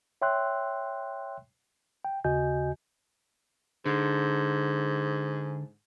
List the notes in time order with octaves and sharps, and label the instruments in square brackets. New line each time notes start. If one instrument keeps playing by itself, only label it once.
[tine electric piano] C#5 E5 G5 C6 E6 F#6
G5
D#2 C#3 F#4 D#5 G#5 G6
[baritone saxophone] G#2 [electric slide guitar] D3